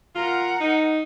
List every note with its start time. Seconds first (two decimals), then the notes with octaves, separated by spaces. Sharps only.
0.15 F4 A#4 F#5
0.60 D#4